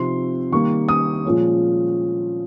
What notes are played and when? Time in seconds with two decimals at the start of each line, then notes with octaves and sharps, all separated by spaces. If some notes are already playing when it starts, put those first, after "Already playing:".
Already playing: C3 F3 C4 D#4 C6
0.52 D#3 G3 A#3 C#6
0.88 D#6
1.25 A#2 F3 G#3 C#4